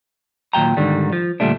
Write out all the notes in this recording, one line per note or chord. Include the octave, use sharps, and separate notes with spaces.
D#2 A#2 F#3 G5 A#5
G#2 D3 D#3 G3
F3
D2 A#2 G3 A3 D4